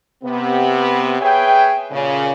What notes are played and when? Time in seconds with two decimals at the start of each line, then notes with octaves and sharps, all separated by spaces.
0.24 C3 B3
1.21 G#4 B4 C#5 E5 G5
1.92 A#2 C#3